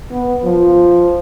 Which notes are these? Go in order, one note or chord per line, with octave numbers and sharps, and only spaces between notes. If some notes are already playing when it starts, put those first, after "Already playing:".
B3
F3